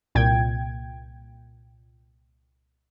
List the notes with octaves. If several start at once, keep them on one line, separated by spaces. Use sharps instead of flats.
C2 A#2 G5 G#6